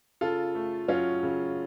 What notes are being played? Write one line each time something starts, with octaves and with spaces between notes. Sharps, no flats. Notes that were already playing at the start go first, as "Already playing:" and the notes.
C#3 F4 A4
A3
F#3 C#4 F4
C#3